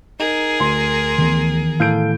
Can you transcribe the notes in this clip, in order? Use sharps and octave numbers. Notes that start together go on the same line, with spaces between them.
D#4 G#4 A#4
D2 C6
D#3 E3 B3
A2 A4 F5 G6 D7